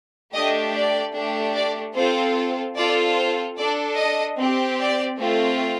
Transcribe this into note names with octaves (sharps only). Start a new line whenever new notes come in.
A3 D4 G4 D#5
D5
A3 D4 G4
D5
C4 F4 A4 C5
C4 F4 A4 D5
C5
D4 A4 D5
D#5
C4 G4
D5
A3 C4 F4